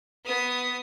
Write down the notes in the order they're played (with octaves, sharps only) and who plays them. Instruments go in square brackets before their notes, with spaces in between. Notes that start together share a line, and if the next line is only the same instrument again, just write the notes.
[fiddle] B3 D#6